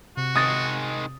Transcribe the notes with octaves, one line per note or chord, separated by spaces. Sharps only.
C3 F#4
D#3 G#3 D#6 A6